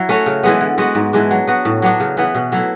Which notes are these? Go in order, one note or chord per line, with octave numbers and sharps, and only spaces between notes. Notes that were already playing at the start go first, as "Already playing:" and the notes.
Already playing: F#3 E4
A3 C#4 F#4
C#3
E3 G#3 B3
D3
G#3 B3 F#4
G#2
E3 G#3 D4
F#3
B3 F#4
A2
F#3 B3 D4
C#3
E3 B3
B2
F#3 A3 E4